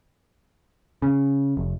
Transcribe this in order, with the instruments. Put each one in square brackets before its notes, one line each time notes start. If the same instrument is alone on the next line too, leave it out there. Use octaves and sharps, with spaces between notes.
[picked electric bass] C#3
F1